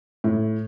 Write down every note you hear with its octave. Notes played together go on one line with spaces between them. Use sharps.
A2